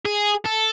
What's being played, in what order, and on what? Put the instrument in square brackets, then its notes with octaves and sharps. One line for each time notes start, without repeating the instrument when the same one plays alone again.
[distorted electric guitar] G#4
A4